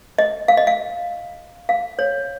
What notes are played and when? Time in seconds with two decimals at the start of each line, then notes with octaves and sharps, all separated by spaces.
0.18 D#5
0.48 F5
0.57 D#5
0.67 F5
1.69 F5
1.99 C#5